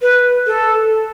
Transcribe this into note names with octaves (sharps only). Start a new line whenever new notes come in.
B4
A4